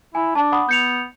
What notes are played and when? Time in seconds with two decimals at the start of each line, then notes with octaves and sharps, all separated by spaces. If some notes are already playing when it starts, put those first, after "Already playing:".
0.15 E4 G#5
0.35 D4 A5
0.52 F#5 B5 D#6
0.69 B3 G6 C#7 F7